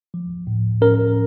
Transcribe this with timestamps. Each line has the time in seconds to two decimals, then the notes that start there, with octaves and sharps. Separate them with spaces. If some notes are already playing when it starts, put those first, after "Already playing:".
0.14 F3
0.47 A2
0.81 C#4 A#4